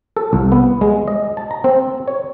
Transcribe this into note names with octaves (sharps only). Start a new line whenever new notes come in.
A4
C2
B3
G#3
D#5
A5
A#5
C4
C#5